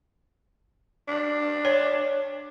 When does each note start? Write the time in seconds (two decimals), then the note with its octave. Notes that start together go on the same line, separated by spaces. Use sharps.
1.08 D4
1.65 C#5